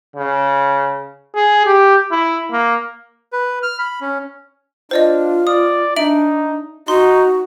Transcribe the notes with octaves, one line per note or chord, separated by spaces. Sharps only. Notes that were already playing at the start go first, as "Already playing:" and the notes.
C#3
G#4
G4
E4
A#3
B4
F6
B5
C#4
D4 F4 C5 D5 D#5
D5 D#6
D4 D#4 E5 D7 F#7
D#4 F#4 C6